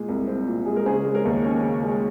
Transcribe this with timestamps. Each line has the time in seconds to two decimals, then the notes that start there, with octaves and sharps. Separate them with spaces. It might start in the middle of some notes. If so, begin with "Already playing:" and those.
Already playing: A#2 G#3 G#4
0.08 C2
0.27 C4
0.47 A#2
0.66 G#3 G#4
0.76 A#4
0.86 C#3 G#4 C5
1.05 G#3
1.15 A#4 C#5
1.25 D#2
1.44 C#4
1.63 C#3
1.83 G#3